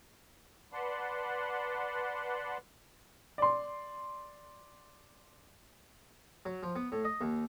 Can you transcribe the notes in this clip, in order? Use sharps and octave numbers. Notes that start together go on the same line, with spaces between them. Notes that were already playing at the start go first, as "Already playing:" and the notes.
B4 D5 F#5 A5 C6
D5 C6
F#3
F3
B3
A2
D#5
D#2